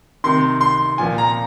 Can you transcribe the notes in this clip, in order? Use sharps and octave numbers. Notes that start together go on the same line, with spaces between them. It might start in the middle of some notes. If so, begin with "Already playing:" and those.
C3 D#3 C6
C6
A#2 F3 G#5
A#5